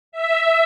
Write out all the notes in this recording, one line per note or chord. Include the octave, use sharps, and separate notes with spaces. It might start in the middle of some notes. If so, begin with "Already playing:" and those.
E5